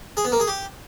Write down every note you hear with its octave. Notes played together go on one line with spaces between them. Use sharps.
G#4
B3
A#3
G#4
G4